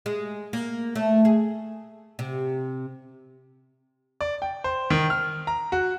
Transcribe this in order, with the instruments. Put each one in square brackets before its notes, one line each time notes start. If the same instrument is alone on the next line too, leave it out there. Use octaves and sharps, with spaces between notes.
[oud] G#3
A#3
A3
G#4
C3
[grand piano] D5
G5
C5
D#3
F6
A#5
F#4